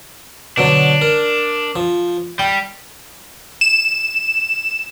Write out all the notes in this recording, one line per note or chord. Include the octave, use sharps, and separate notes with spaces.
B2 D3 F#3 D4
A#4
F3
G3 G5
E7